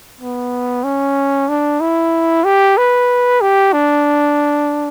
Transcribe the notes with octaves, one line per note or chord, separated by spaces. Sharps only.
B3
C#4
D4
E4
G4
B4
G4
D4